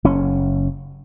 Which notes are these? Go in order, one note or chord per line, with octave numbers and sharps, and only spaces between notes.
F#1 C#4